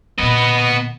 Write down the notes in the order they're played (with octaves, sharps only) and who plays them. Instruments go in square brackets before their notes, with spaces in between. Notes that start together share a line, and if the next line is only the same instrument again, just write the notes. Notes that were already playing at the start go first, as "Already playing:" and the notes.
[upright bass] A#2 D3 [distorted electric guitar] B3 D#5